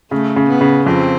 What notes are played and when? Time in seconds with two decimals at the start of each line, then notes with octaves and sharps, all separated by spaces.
0.11 C#3 A3
0.36 C#3
0.49 B3
0.61 C#3
0.86 F2 C4